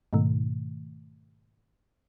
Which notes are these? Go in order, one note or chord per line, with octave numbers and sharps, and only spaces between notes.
G#2 B2 D#3 A3